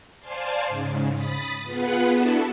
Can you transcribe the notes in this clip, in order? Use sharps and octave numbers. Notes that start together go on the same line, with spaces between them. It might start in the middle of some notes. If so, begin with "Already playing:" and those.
C5 D5 F5 G#5 A5 C6
G#2 C#3
B5 D#6 A6 B6
B3 F4 G#4 B4 F#5
B3 D4 E4 F#4 A4 A5